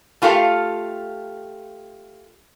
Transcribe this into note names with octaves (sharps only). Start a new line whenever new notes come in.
A3 F4 G4 A4 F5